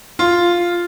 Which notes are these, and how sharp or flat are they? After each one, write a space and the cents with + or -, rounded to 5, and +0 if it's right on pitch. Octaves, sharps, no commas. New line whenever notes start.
F4 +0